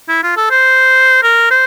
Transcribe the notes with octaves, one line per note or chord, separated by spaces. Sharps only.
E4
F4
A4
C5
A#4
C5